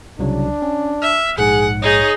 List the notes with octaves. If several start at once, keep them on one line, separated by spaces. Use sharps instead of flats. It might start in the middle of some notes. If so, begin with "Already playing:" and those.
C2 C#3 F#3 D4
C#4
E5 F6
A#1 G#2 G#4 F#5
D#4 G#4 C#5